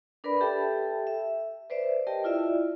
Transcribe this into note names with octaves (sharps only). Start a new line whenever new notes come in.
D4 A#4 B4 D5 B5
G4 A4 E5 G5 A5
E5
B4 C5 D5 E5
G4 A#4 D#5 G5 A5
E4 F4 D5 E5